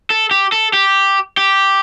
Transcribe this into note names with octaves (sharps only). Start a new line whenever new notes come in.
A4
G4
A4
G4
G4